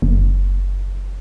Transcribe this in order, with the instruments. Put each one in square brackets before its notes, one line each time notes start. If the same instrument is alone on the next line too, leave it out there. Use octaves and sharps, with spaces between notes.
[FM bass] F#1